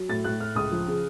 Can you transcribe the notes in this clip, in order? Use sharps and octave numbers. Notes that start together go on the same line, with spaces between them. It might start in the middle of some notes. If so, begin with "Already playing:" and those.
Already playing: F#3
A2 A6
A2 F#6
A2 F6
C#2 D#6
F3
C#3